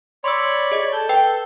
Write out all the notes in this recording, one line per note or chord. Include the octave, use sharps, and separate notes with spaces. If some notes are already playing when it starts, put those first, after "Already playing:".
C#5 D5 B5 C6 E6
G#4 D#5
A4 G6
B4 G5